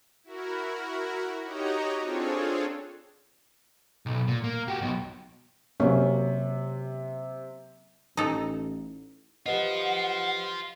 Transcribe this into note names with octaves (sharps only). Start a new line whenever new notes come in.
E4 F#4 A#4
D#4 F#4 G4 C#5 D#5 A#5
C4 D4 F4 G#4 A4 C#5
B1
A#2
A#3
F#4 G4
B1 B2
C3 F#3 A#3 C#4
A1 D#4 A4
F4 G4 B4 C5 D#5 F#5